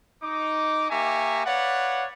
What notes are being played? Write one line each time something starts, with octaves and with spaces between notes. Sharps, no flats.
D#4 D6
A#3 G4 E5 G#5 A#5 C#6
B4 C#5 D5 F5 F#5